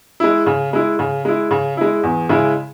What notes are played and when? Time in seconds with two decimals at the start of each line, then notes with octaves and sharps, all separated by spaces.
0.20 G#3 E4
0.46 C#3
0.73 G#3 E4
0.99 C#3
1.25 G#3 E4
1.51 C#3
1.77 G#3 E4
2.03 E2
2.29 C#3 G#3 E4